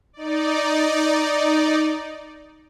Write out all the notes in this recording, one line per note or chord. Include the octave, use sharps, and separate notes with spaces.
D#4 D5